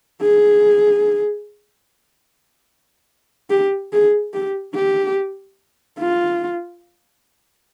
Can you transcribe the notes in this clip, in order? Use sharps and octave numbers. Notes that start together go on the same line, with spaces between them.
G#4
G4
G#4
G4
G4
F4